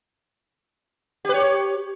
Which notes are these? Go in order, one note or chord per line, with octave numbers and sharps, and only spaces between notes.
G4 B4 C#5